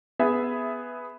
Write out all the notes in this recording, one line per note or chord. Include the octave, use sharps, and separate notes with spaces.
B3 G#4 E5